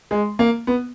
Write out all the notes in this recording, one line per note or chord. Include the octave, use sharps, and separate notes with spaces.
G#3
A#3
B3